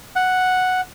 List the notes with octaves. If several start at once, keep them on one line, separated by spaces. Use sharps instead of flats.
F#5